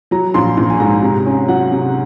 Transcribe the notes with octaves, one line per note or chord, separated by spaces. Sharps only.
F#3 A#5
A#1 C6
A#1
G#5
G#2 A#5
C3
C#4
F#3 F#5
C3